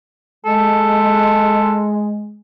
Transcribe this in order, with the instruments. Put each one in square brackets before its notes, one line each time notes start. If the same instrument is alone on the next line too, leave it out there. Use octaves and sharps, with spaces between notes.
[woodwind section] G#3 [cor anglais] A4